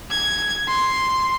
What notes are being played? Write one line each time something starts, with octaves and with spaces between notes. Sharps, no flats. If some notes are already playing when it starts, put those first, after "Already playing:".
G#6
C6